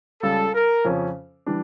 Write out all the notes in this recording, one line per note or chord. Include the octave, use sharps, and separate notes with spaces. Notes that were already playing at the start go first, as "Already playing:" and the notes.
C#2 C#3 G3 A4
A#4
F2 C#3 F3 C#4
E3 G3 D4